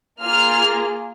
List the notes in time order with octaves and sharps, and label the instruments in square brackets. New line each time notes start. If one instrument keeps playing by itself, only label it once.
[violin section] A#3 F4 G#4 F6